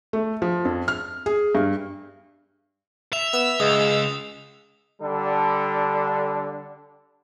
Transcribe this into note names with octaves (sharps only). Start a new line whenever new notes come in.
A3
F3
F2
F6
G#4
G2
E5 F7
B3 E6
C#2 G#3 D#6
D3 G3 D4 A4